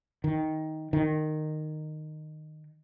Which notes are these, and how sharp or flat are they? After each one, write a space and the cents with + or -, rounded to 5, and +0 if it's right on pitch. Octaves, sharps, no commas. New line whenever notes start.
D#3 +10
D#3 -15